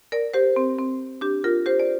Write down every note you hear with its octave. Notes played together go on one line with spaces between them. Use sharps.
A#4 D5
G4 C5
C4
C4
D4 G4
F4 A#4
G4 C5
D5